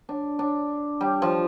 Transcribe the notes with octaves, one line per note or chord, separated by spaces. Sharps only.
D4
D4
G3
F3